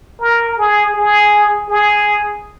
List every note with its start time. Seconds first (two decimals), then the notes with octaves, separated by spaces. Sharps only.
0.20 A#4
0.58 G#4
0.95 G#4
1.69 G#4